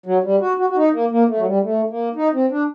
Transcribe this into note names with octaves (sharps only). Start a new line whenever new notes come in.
F#3
G3
F#4
F#4
F#4
D#4
A#3
A#3
A3
F#3
G3
A3
A#3
D#4
C4
D4